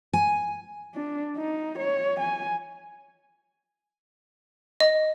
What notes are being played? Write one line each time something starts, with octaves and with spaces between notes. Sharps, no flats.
G#5
D4
D#4
C#5
G#5
D#5